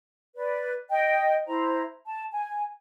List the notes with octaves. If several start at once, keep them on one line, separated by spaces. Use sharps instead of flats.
B4 D5
D#5 G5
E4 C5 A#5
A5
G#5